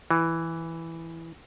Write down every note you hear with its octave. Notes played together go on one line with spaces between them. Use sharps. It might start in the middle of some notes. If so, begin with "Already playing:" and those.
E3